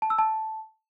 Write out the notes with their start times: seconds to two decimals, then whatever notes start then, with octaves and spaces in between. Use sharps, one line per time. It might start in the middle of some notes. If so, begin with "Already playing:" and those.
0.02 A5
0.10 E6
0.19 A5